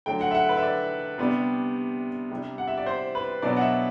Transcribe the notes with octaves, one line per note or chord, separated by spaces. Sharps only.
D3 F#3 A3 G5
F#5
E5
F#5
B4
E5
D5
C3 G3 B3 D4
C3 G3 D4
F#5
E5
D5
C5
B4
B2 F#3 B3 D4 D5
F#5
E5